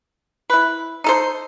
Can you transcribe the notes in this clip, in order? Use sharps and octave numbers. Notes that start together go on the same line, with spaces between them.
E4 B4
D#4 A4 C5